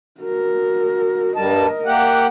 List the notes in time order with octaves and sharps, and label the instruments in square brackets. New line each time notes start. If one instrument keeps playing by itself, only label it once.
[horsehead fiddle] F#4 A#4
[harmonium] G2 G3 A5 [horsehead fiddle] A#4 D#5
[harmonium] A#3 G4 F#5